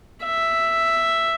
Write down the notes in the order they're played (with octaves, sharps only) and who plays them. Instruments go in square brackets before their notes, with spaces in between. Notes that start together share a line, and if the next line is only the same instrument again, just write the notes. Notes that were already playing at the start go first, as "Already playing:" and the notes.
[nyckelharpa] E5